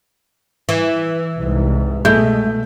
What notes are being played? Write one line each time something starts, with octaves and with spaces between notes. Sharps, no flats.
E3
C2 G#2
B2 G#3 A3 E4 G6